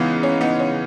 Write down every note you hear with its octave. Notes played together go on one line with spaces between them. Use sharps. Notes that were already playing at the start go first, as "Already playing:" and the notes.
Already playing: C#3 E3 G#3 B3 D#4
C#4
B3 D#4
C#4